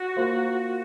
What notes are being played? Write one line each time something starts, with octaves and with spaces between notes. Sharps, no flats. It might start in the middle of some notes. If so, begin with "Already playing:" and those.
Already playing: F#4
A#3 F4 C5